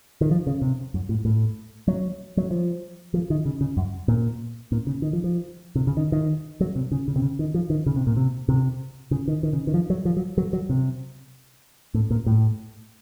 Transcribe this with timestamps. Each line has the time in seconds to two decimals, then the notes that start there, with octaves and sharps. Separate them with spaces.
0.21 D#3
0.31 F3
0.47 C#3
0.62 C3
0.94 F#2
1.09 A2
1.25 A2
1.88 F#3
2.37 F#3
2.51 F3
3.14 F3
3.30 D#3
3.45 C#3
3.61 C#3
3.77 F#2
4.08 A#2
4.72 A#2
4.87 C#3
5.02 D#3
5.13 F3
5.24 F3
5.75 C3
5.87 C#3
5.97 D#3
6.12 D#3
6.61 F#3
6.76 C3
6.92 C#3
7.08 C#3
7.16 C3
7.22 C#3
7.39 D#3
7.54 F3
7.70 D#3
7.86 C#3
7.96 C3
8.07 A#2
8.17 C3
8.49 C3
9.11 C#3
9.28 D#3
9.43 D#3
9.53 C#3
9.67 D#3
9.74 F3
9.90 F#3
10.05 F3
10.17 F#3
10.38 F#3
10.53 F#3
10.69 C3
11.94 A2
12.11 A#2
12.26 A2